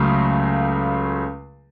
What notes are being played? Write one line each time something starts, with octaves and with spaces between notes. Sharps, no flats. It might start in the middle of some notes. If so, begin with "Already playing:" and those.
Already playing: C#2 C#3 F#3 A3